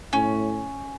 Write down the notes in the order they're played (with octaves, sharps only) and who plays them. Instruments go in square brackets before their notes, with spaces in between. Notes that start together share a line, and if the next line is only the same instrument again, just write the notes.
[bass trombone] A2 [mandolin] C#4